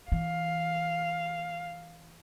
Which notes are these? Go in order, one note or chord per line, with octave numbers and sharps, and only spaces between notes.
E3 F5